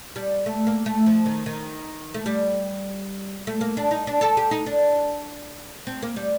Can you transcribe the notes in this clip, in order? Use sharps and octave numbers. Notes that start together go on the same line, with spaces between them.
G3
A3
A#3
A3
F3
D#3
D#3
A3
G3
A3
A#3
D4
D#4
D4
A4
G4
D#4
D4
C4
A#3
G3